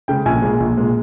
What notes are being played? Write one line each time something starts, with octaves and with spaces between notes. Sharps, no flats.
C#3 G#3 G5
A#1 G#5
A#2 G#3
A#1
A#2 G#3